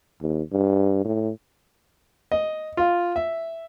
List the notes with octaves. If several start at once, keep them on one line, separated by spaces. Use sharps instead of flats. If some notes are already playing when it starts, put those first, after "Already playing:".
D#2
G2
A2
D#5
F4
E5